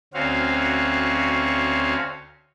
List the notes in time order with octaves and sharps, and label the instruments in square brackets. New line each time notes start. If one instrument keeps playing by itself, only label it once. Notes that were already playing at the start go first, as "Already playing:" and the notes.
[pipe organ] D2 C4 C#4 F#4 F5